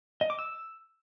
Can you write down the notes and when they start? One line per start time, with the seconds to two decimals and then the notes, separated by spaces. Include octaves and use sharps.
0.21 D#5
0.30 D6
0.39 E6